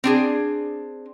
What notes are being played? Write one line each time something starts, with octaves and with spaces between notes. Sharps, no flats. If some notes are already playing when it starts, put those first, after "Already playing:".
C4 D4 G#4